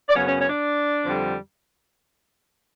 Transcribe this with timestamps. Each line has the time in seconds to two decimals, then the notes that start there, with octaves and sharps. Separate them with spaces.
0.09 D5
0.14 F#2 C#3 F#3 B3 C#4 C#5
0.26 C#4 C#5
0.37 C#4 C#5
0.48 D4 D5
1.05 F2 D3 G3